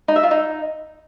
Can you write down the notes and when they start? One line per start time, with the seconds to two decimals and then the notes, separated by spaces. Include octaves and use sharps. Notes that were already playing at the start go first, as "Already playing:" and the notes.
0.08 D#4
0.16 E5
0.23 F4
0.31 D#4